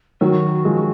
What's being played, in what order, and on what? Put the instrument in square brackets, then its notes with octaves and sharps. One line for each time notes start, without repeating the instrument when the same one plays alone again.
[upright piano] D#3 F#3 [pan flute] F#4
[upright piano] F3 G#3